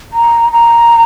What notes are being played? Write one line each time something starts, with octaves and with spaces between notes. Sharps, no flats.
A#5
A#5